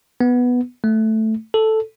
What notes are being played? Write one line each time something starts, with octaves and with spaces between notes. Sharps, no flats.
B3
A3
A4